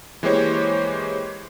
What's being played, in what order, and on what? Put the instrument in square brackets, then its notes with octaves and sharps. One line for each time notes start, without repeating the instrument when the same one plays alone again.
[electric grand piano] E3 G#3 A#3 G4 C5 C#5